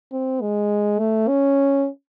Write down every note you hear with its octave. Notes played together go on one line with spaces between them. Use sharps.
C4
G#3
A3
C#4